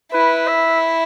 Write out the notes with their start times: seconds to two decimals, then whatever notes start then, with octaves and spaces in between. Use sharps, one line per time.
0.12 E4 B4
0.48 E5